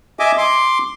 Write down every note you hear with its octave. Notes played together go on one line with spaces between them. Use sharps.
D#5 E5 G#5 D6
C6 D6